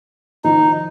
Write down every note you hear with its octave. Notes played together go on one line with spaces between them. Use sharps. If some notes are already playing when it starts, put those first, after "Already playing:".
D#3 F3 D#4